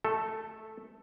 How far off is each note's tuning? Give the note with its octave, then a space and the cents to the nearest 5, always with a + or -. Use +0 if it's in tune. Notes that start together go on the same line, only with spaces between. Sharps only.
A3 -5 A4 +0